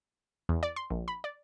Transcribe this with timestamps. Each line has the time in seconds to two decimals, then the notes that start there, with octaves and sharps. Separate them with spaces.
0.49 E2
0.63 D5
0.76 C6
0.90 A#1
1.08 B5
1.24 D5